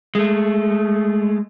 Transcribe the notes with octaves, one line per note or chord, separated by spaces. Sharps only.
G#3 A3